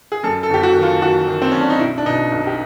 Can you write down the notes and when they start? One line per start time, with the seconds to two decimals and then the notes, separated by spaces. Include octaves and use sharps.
0.12 G#4
0.23 F#2 A4
0.43 A4
0.50 F#1 G4
0.63 F#4
0.75 D#3
0.83 F4
1.02 D#3 F#4
1.27 D#3
1.42 C4
1.52 F#2 C#4
1.61 D4
1.70 D#4
1.79 B1 E4
1.98 D4
2.06 B2 D#4
2.32 B1
2.47 G4